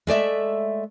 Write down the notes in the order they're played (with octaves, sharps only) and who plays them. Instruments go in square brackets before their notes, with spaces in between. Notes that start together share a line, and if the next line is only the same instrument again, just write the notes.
[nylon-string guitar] G#3 A3 D5 E5